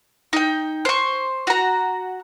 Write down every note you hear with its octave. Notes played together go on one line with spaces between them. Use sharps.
D#4 G5
C5 C#6
F#4 A#5